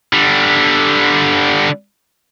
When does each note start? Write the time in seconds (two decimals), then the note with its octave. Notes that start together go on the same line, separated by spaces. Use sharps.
0.13 D3 G3